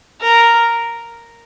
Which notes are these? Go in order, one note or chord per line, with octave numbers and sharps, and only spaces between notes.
A#4